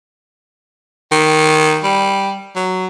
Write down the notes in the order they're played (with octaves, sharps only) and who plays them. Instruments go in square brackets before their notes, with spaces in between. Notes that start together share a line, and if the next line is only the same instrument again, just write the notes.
[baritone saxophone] D#3
G3
F#3